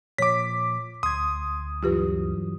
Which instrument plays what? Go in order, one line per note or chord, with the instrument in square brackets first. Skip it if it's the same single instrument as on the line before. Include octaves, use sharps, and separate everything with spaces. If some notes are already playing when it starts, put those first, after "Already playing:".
[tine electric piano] A#2 F3 [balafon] C#5 [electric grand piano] D6 B6
[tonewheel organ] D2 [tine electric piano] C6 G#6 [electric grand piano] D#6
[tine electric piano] G2 E3 F#3 [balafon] F4 G4 B4